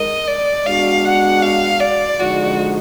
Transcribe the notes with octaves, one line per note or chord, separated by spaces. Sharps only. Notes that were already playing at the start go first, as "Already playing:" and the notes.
Already playing: G#3 D#4 A#4 D#5
D5
G#3 B3 D4 F#4 F5
F#5
F5
D5
D3 F3 G#3 D#4 F#4